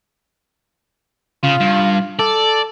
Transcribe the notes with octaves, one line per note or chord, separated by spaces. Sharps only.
C#3 F4
G2
A4 D5